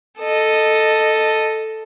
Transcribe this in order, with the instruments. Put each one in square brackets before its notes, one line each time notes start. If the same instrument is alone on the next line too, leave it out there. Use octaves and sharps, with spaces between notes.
[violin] A4 D#5